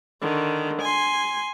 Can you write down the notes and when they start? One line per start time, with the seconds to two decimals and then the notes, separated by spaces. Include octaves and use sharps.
0.22 D3 D#3
0.82 G#5 C6